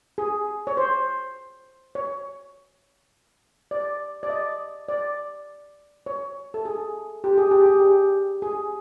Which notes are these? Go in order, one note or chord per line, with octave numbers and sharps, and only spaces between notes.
G#4
C#5
C5
C#5
D5
D5
D#5
D5
C#5
A4
G#4
G4
G#4
G4
G#4
G4
G#4